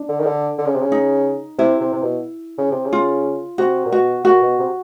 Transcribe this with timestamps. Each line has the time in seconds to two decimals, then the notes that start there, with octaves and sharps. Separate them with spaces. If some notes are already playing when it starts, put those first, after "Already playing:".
Already playing: D4
0.09 D3
0.21 D#3
0.26 D3
0.58 D3
0.66 C#3
0.74 C3
0.81 C#3
0.92 D#4
1.58 C3 E4
1.81 C3
1.93 C3
2.03 B2
2.58 C#3
2.71 C3
2.85 C#3
2.93 F4
3.58 C3 F#4
3.85 A#2
3.92 B2 F#4
4.25 A#2 F#4
4.42 B2
4.59 C3